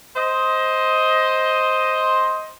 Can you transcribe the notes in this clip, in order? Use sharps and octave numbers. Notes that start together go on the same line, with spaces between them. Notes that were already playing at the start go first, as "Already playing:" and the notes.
C5 D#5